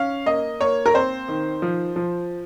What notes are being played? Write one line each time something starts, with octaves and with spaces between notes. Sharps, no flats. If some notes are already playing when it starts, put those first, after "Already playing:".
Already playing: C#4 F5
A#3 D#5
A#3 C#5
A#4
C4 C5
D#3
F3
F3